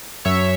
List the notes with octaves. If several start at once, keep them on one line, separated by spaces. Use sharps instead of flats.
F#2 C#5 E5